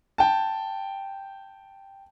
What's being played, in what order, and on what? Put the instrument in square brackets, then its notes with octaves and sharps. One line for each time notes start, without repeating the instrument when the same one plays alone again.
[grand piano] G5 A5